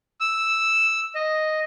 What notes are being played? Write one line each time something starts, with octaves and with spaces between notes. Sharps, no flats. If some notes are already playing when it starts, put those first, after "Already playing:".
E6
D#5